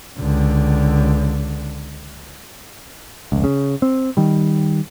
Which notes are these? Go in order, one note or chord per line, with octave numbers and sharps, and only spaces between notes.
C#2 D3
F1 C#2
C#3
C4
D#3 G3